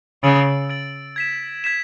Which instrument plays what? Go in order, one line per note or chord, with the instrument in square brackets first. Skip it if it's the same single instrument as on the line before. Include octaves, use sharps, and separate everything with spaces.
[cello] C#3 [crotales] E6 A6 D7 F#7
[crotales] E6 A6 D7 F#7
G#6 B6 E7
G#6 B6 E7